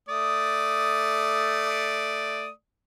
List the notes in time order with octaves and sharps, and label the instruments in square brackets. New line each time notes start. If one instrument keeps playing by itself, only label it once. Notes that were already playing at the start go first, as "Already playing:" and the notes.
[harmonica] A3 D5 D#6